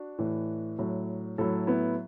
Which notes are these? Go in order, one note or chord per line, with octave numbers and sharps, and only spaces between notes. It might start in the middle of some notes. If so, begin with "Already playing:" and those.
Already playing: D4 F#4
A2 E3
A2 F#3
A2 F#3 E4 A4
B3 E4